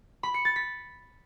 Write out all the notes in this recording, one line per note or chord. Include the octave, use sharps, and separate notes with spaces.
B5
C#7
A6
B6